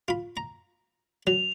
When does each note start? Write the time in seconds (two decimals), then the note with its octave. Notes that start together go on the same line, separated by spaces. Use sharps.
0.08 F4 B5
0.37 A#5
1.27 F#3 F7